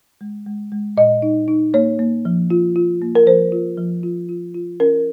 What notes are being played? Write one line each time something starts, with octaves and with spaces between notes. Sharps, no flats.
G#3
G#3
G#3
A#2 D#5
D#4
D#4
A#3 C#5
A#3
F3
F4
F4
A#3
A#4
F3 C5
F4
F3
F4
F4
F4
C#4 A#4